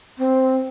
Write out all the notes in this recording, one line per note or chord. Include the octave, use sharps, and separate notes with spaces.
C4